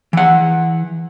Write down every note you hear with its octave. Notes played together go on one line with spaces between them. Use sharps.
E3 F#5